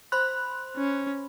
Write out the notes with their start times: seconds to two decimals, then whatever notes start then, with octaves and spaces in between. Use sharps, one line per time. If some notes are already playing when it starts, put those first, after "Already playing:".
0.12 C5 B5 C6 F#6
0.77 C#4